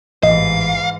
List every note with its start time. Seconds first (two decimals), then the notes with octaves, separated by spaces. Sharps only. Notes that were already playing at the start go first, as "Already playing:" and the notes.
0.23 A1 G#2 E3 D#5 F5